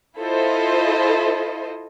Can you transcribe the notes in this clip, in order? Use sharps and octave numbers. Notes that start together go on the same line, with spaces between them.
E4 F4 A4 C5 D#5